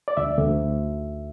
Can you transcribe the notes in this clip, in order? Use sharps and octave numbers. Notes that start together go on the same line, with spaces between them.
D5
D2 E5
D2